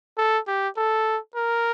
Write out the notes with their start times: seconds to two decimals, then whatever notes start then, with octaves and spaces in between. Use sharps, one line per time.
0.18 A4
0.47 G4
0.77 A4
1.36 A#4